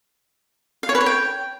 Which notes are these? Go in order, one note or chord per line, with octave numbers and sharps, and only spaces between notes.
F5
C#5
B4
C#5
G5